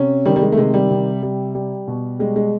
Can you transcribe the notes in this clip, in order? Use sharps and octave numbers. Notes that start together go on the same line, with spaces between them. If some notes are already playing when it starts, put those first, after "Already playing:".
Already playing: C3 C#4
D#3 G3
G3
G#3
A3
C3 G#3
G3
C3
G3
G3
B2
G3 G#3
G#3